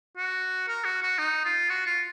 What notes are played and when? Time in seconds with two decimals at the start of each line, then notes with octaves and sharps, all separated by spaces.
0.17 F#4
0.68 A#4
0.85 F#4
1.03 F#4
1.19 D#4
1.45 F4
1.70 F#4
1.87 F4